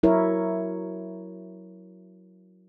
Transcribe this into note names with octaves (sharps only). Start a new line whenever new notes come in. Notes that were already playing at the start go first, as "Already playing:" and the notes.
F#3 E4 A#4 C#5